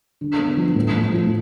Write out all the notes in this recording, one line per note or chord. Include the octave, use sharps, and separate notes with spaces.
D3
B3
F3
A2
A2
F3